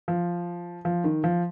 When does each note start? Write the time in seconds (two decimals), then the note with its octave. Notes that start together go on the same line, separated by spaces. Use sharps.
0.08 F3
0.85 F3
1.04 D#3
1.24 F3